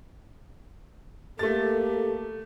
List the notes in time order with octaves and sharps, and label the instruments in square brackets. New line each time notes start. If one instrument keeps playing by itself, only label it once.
[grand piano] A3 A6 [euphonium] A#3 [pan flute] G4 [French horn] A4